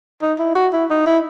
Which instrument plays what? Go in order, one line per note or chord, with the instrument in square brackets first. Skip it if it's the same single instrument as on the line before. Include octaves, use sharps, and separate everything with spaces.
[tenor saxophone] D#4
E4
F#4
E4
D#4
E4